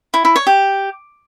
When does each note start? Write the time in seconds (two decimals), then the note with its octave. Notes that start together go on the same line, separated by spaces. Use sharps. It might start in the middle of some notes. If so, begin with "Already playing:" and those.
0.14 E4
0.25 E4
0.36 C#5
0.47 G4